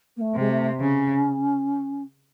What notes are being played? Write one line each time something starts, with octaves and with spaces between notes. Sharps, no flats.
A#3
A3
C3 G#3
A3
C#3 C#4